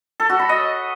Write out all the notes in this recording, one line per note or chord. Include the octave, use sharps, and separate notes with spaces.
A4
F#4
B5
D#5